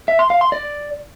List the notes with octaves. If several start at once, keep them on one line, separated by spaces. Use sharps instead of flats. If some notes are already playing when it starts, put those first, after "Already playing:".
E5
C6
F5
C6
D5